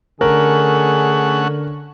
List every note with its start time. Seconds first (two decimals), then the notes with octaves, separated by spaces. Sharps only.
0.21 D3 A3 C#4 G#4 A#4 F#5